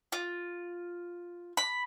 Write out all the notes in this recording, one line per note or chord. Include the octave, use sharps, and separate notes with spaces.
F4
B5